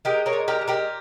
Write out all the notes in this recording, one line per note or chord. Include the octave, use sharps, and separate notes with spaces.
G#3 G4 A#4
A#4 C#5
A#2
G4 A#4
G#3
G4 A#4